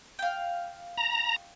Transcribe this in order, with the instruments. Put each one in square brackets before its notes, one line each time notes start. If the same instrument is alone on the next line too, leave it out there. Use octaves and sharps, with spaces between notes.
[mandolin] F5 G5
[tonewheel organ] A#5